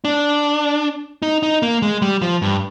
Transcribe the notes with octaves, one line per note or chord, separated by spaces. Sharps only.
D4
D#4
D#4
A#3
G#3
G3
F3
G2